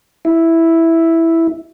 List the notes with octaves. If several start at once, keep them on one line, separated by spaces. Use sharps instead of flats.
E4